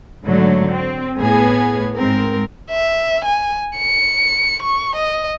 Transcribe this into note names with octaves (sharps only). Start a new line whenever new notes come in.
G#2 D3 F#3 A3
C4
A2 B3 G#4
G#2 C4 A#4
E5
G#5
C#7
C#6
D#5